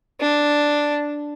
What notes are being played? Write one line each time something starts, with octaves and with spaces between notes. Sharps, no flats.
D4